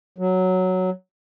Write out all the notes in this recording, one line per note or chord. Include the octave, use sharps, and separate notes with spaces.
F#3